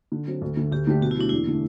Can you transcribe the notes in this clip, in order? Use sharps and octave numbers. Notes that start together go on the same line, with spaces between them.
D3
F#3 C4
D2
D3 A3
D2 G4
D3 A3 D4 G4
B2 F#4
E4
F#3 A3 D4
E2 E4
D3 A3